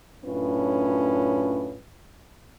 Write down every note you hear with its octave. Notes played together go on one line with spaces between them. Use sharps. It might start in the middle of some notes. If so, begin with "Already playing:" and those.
F#2 A2 C#4 D4 F4 B4